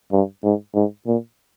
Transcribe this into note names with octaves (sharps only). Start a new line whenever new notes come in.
G2
G#2
G#2
A#2